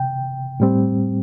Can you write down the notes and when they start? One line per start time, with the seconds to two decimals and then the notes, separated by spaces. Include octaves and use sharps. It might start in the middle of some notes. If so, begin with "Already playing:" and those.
Already playing: C3 G5
0.60 A2 G3 C4